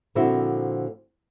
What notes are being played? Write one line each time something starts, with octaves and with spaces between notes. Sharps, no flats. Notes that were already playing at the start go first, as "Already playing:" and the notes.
A#2 D3 F3 C4 E4 F#4